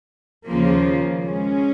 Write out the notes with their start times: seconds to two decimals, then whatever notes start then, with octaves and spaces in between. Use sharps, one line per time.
0.49 D#2 C#3 F3 A#3
1.24 G#3 C#4